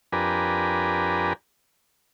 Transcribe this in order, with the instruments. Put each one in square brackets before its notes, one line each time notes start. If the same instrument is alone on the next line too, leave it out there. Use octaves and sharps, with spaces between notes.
[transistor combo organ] F2 D4 G4 A#4 B4 G#5